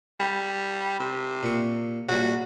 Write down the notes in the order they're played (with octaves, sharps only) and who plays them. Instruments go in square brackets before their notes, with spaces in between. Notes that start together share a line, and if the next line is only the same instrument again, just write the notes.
[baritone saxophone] G3
C3
[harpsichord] A#2 C#6
[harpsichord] A#1 G3 [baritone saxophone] F#4